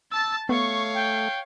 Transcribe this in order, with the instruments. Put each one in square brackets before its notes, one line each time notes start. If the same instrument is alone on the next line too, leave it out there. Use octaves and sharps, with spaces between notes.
[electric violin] A5 A6 [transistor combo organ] E6
[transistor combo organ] A3 [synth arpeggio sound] B3 [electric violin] C#5 F5 [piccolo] C#6
[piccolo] G5